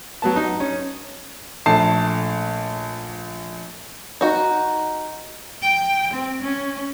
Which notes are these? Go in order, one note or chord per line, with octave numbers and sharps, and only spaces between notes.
F#3 B3 A5
D#4
C#4
A#1 A3 A5 C7
D#4 F#4
G5
C4
C#4